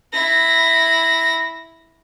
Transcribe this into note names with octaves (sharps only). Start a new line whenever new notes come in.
E4 A#6